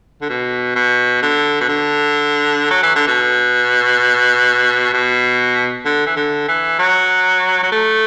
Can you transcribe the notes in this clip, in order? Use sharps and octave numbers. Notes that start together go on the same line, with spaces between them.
D3
B2
B2
D3
B2
D3
F#3
E3
D3
B2
B2
D3
E3
D3
E3
F#3
F#3
A3